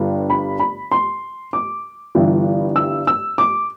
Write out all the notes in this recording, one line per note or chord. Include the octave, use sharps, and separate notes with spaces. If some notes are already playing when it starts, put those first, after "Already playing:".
Already playing: G1 G2 D3 G3
B5
B5
C6
D6
G1 G2 E3 G3
E6
E6
D6